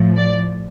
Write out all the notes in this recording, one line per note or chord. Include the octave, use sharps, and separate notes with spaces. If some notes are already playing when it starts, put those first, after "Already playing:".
Already playing: A2 F3
D5